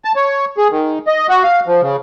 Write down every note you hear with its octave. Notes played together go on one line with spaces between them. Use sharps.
A5
C#5
G#4
D#3
D#5
F#4
F5
F3
C#3